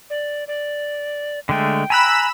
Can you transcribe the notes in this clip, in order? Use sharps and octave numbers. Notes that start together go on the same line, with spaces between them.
D5
D5
D3 G#3 A3 G5
G#5 A#5 B5 E6 F#6 E7